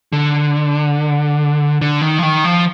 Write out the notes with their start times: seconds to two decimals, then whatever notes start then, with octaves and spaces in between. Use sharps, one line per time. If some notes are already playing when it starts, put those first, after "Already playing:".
0.13 D3
1.82 D3
2.01 D#3
2.18 F3
2.23 D#3
2.44 F3